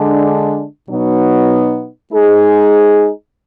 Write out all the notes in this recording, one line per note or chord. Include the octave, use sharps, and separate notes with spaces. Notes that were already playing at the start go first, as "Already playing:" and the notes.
Already playing: D3 G#3 D4
B2 F#3 B3 D#4
G#3 D#4 G#4